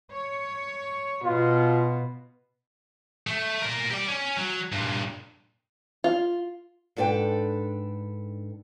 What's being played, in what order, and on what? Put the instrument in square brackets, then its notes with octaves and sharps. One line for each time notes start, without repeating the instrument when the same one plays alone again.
[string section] C#5
[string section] B2 [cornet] F4
[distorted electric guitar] A3
A#4 D5
G4 D5
C#4
F#3
G2 A#2
[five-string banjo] F4
[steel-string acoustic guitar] G#2 D4 A4 B4 G5